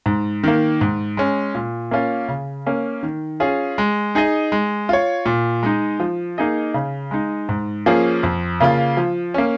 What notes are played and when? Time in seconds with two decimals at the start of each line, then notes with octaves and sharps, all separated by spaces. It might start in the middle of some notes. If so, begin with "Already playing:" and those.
0.06 G#2
0.43 D#3 A#3
0.81 G#2
1.17 G#3 C#4
1.55 A#2
1.91 A#3 C#4 F4
2.28 C#3
2.67 A#3 C#4
3.03 D#3
3.40 C#4 F4 G#4
3.78 G#3
4.15 D#4 G#4 D#5
4.52 G#3
4.89 F4 C#5
5.26 A#2
5.63 G#3 D#4
6.00 F3
6.38 A#3 D#4 G#4 D#5
6.74 C#3
7.11 G#3 D#4
7.49 G#2
7.86 F3 A#3 C#4 G#4
8.23 F2
8.60 C#3 A#3 F4
8.97 F3
9.34 A#3 C#4